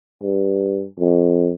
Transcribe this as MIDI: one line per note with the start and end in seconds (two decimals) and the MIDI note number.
0.22 0.84 43
1.00 1.53 41